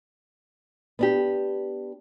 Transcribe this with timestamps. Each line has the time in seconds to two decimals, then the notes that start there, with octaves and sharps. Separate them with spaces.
0.99 B3 D4 G4